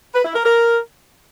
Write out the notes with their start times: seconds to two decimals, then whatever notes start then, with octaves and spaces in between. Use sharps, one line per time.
0.14 B4
0.24 E4
0.34 A#4
0.45 A#4